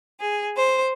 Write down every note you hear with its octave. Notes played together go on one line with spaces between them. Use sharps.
G#4
C5